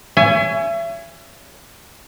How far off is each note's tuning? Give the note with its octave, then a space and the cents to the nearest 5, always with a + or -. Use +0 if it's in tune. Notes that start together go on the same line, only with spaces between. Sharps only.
C#5 +25 E5 +35 G#5 +0